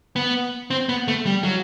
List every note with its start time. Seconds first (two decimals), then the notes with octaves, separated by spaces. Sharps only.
0.16 B3
0.70 C4
0.89 B3
1.08 A3
1.26 G3
1.43 F#3